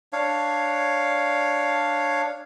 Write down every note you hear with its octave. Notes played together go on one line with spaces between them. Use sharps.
D4 C#5 F5